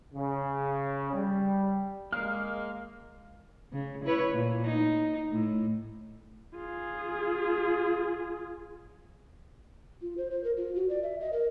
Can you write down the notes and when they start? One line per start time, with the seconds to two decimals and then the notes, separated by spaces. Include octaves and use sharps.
0.14 C#3
1.14 G3
2.12 G#3 A#3 A#4 F5 F6
3.73 C#3
4.05 E4 B4 C#5
4.34 A#2
4.64 D#4
5.31 A2
6.56 F4 G#4
10.02 F4
10.18 C5
10.31 C5
10.44 A#4
10.57 F4
10.75 F#4
10.89 D5
11.03 E5
11.20 D#5
11.33 A#4